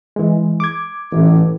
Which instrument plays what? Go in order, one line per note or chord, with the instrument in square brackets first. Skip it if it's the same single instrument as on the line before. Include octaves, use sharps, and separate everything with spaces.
[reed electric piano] E3 G#3
D6 G#6
[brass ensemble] A1